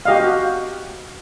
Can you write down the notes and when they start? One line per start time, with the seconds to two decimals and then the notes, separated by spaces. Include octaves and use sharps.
0.05 F#4 G4 D#5 F5